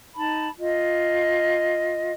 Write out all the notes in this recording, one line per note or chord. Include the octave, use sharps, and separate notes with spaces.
D#4 A5 B5
F4 D#5